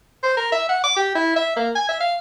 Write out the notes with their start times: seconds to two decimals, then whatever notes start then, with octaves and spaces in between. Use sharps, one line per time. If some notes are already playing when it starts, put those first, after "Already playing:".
0.23 C5
0.37 A#4
0.52 E5
0.69 F#5
0.84 D6
0.96 G4
1.15 E4
1.36 E5
1.56 A#3
1.75 G#5
1.89 E5
2.00 F5